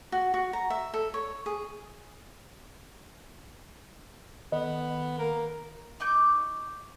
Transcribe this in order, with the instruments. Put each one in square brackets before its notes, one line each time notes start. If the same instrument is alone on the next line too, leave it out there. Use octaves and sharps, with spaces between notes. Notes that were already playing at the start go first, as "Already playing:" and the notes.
[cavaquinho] F#4
F#4
A#5
E5
A4
C#5
G#4
[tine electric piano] D#3 A4 [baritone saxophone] B3 [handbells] D#5
[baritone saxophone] A#3 [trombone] A#4
[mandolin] D#4 C#6 D6 G6